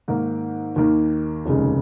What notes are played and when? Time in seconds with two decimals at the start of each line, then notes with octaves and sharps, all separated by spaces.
0.08 G#2 D#3 A#3
0.76 D#2 D#3 A#3
1.46 F1 D#2 C#3 G#3